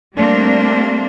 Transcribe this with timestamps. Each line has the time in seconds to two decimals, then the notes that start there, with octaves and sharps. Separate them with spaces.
0.15 G3 A3 A#3 C4 D4